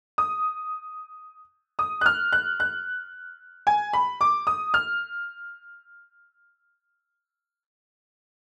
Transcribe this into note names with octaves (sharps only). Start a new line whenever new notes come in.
D#6
D#6
F#6
F6
F#6
F#6
G#5
B5
D6
D#6
F6